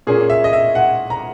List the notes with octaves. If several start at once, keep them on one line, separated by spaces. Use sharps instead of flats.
A#2 A#3 C#4 G#4
E5
D#5
E5
F#5
A#5